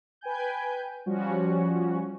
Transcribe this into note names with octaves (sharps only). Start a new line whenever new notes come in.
B4 G5 G#5 G6
F3 G3 C#4 F#4